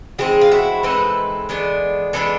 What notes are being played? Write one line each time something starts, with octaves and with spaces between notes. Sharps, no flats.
E3 G#3 C4 D#4 F#4 G#4
F4
E4 F#4
E3 G#3 C4 D#4 A4 B4
E3 G#3 B3 D4
E3 G#3 B3 D4 A4 B4